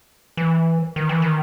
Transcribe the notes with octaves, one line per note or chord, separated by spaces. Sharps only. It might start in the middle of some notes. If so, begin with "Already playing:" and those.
E3
D#3
E3
D#3